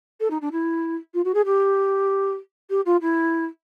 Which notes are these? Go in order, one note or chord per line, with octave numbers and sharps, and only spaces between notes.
A4
D#4
D4
E4
F4
F#4
G#4
G4
G4
F4
E4